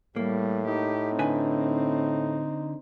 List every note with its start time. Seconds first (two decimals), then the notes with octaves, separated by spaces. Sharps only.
0.16 A2 G3 A#3
0.67 D#4 G4
1.19 D3 C4 B4 G#5